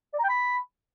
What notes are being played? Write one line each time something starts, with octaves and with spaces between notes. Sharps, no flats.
D5
A#5
G5
B5